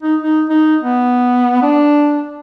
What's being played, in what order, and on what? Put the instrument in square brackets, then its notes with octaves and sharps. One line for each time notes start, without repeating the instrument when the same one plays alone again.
[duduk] D#4
D#4
D#4
B3
D4